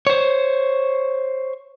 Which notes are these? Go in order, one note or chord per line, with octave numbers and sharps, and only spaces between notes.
C5 C#5